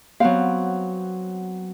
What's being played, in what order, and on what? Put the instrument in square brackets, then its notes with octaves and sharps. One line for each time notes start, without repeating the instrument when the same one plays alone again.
[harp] F#3 B3 C4 [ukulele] F5